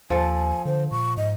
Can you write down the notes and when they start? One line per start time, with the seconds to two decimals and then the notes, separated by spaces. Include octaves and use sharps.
0.10 D#2 F3 A4 G#5
0.65 D3 C5
0.91 A#2 C#6
1.17 G#2 D#5